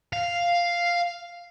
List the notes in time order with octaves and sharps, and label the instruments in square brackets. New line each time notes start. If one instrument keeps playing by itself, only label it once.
[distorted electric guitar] F5